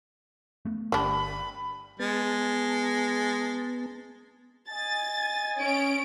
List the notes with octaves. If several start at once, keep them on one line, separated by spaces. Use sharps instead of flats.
A3 B3
G1 G3 D4 B5
G#3 B3 A5
D#5 G#5 A6
C#4 D7